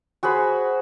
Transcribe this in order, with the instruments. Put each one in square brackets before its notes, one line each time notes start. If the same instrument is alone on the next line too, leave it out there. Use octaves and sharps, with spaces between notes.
[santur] F#4 G#4 C5 B5